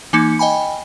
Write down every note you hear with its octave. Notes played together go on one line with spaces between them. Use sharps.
E3 A#3 D#4 C#7
D#5 G5 G#5 B5